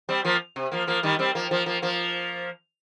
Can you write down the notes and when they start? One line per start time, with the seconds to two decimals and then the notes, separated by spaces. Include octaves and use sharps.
0.09 G3 C4
0.25 F3 A#3
0.56 C3
0.72 F3 A#3
0.87 F3 A#3
1.03 D#3 G3
1.19 G3 C4
1.35 F3 A#3
1.51 F3 A#3
1.66 F3 A#3
1.82 F3 A#3